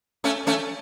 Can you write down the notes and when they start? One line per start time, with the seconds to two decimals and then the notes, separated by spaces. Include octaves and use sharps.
0.24 A3 C#4
0.47 A3 C#4